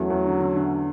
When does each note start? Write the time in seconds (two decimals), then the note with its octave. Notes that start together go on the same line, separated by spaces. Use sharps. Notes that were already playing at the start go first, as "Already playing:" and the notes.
Already playing: E2 F#3 A3 C#4
0.10 E2
0.26 D3
0.40 D3
0.56 D3